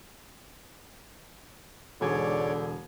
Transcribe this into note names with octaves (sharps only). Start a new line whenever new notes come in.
E1 G#2 D3 G#4 C#5 D5 G#6